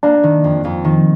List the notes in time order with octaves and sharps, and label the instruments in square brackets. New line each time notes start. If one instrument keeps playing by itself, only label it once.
[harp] A#3 [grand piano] D4
[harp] D#3
F2
F2
D#3